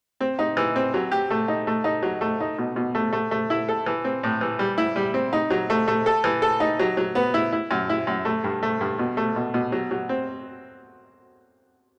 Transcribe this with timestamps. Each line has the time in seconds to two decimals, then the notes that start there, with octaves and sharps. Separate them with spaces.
0.20 C4
0.39 D#4
0.57 E3
0.76 C4
0.94 F#3
1.12 G4
1.30 A3
1.48 D#4
1.67 A3
1.84 D#4
2.03 F#3
2.21 A3
2.40 D#4
2.58 B2
2.76 B2
2.95 A3
3.13 A3
3.31 A3
3.50 E4
3.68 A4
3.86 E3
4.04 C4
4.23 A2
4.41 E3
4.59 G3
4.78 E4
4.96 G3
5.14 C4
5.33 D#4
5.50 F#3
5.70 A3
5.88 A3
6.06 A4
6.24 E3
6.42 A4
6.60 D#4
6.79 F#3
6.97 F#3
7.15 B3
7.34 E4
7.52 E4
7.71 F#2
7.90 E4
8.07 F#2
8.25 A3
8.44 G2
8.63 A3
8.81 G2
8.99 B2
9.17 A3
9.36 B2
9.54 B2
9.72 F#3
9.91 F#3
10.09 C4